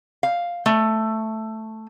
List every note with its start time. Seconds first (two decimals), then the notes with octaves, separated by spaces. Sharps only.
0.23 F5
0.66 A3